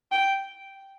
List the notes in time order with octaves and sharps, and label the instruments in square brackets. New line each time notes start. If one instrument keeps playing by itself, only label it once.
[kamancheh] G5